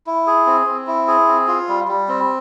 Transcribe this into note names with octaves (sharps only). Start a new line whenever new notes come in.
E4
G#4
C4
C4
E4
G#4
C4
F4
G3
G3
C4